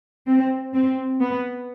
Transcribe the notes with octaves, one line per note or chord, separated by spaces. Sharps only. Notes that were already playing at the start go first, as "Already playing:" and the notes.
C4
C4
B3